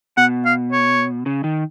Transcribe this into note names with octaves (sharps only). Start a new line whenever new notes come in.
B2 F#5
F5
C#5
C#3
D#3